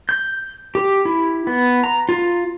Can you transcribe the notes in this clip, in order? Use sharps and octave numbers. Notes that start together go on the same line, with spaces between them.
G6
G4
E4
B3
A#5
F4